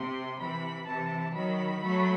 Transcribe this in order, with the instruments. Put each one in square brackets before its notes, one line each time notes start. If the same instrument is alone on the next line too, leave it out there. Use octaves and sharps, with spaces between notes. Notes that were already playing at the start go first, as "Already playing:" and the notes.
Already playing: [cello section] C3 [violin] C6
[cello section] C3 E3 [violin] B5
[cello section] C3 E3 [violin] A5
[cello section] D#3 F#3 [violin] B5
[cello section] F#3 A3